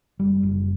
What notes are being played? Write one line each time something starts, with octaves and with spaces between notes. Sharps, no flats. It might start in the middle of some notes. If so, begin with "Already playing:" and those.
F#1 G3
F#1